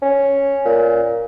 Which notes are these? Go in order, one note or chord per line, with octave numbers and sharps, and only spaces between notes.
C#4
A#2